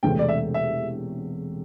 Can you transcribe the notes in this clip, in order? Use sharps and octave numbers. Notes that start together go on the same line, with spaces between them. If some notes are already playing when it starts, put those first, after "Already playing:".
E1 E2 C3 A3 G5
D5
E5
E5